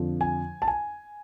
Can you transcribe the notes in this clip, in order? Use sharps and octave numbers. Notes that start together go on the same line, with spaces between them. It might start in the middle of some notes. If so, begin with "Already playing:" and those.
Already playing: F2 D3 F3
G#5
A5
G#5